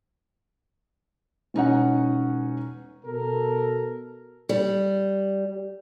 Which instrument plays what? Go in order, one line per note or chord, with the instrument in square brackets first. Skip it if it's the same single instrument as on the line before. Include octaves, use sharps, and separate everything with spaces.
[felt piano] E1 C#4 D#4 F#5
[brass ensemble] B2 A4 A#4
[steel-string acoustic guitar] G3